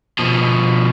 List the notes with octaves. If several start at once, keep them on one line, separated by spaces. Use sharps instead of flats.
B2 F3